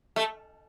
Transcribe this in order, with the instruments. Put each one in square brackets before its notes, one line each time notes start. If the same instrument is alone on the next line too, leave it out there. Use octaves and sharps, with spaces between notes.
[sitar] A3